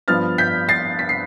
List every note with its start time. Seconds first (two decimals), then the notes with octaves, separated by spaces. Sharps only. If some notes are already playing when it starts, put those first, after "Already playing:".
0.08 G2 F3 B3 F6 A6
0.38 G6 B6
0.69 A6 C7
0.99 B6
1.09 C7